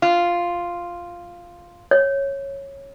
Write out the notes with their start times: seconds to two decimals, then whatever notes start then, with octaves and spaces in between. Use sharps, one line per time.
0.02 F4
1.91 C#5